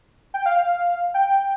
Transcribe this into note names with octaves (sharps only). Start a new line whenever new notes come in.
G5
F5
G5